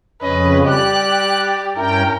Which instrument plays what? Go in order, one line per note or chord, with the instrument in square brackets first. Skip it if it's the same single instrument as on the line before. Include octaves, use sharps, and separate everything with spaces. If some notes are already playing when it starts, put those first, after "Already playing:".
[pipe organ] F2 C#3 [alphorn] C#4 [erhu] B4 [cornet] D#5
[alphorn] G3 [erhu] G4 [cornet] D5 [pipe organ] F#6
[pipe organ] G2 C#4 G5 [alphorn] E4 [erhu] A#4